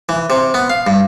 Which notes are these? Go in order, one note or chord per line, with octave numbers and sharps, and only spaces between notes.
E3
C3
B3
F5
G2